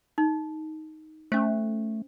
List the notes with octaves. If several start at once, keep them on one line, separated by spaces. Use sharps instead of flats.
D#4
A3 C#4 C5